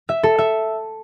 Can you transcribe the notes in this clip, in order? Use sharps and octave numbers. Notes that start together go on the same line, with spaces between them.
E5
A4
E5